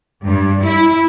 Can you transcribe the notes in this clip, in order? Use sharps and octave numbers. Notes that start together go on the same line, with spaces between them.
G2
E4